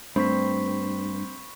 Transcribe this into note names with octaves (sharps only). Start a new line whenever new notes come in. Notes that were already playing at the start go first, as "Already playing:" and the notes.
G2 A3 C4 B5 C#6 B6